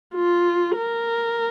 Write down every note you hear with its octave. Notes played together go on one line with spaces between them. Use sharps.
F4
A#4